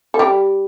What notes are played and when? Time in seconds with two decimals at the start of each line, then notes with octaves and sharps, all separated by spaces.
0.14 A4
0.19 G3 G4